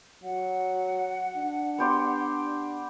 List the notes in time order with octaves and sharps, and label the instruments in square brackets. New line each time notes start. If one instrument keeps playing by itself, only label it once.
[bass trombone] F#3 [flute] F#5
[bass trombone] D4
[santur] B3 G4 C6